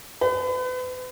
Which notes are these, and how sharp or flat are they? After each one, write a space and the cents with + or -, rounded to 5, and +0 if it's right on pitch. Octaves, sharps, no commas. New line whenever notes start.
B4 +40